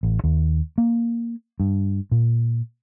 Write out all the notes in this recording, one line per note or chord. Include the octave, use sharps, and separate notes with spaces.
A1
D#2
A#3
G2
A#2